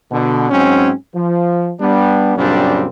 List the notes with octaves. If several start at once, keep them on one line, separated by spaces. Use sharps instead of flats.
B2 D3
G#2 F#3 C4 C#4
F3
G3 B3 D4
F#2 A#2 C#3 G3 C4 D4